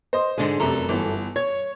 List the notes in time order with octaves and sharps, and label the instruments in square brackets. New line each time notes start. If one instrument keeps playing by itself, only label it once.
[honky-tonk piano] C5 D#5 C6
[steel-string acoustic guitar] G#2 D3 G#3
[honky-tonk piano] F1 C3 A#5 [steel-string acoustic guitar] F#2 A4
[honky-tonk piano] G1 E3 B3
[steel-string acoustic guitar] C#5 [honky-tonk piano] G#6